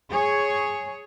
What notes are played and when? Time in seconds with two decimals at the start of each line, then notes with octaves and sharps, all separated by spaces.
0.10 G#4 C#5